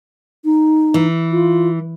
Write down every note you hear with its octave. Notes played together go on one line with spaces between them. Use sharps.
D#4
E3
F4